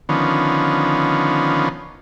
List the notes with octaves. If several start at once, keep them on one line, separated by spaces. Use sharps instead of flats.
D3 D#3 F3 B3 C#4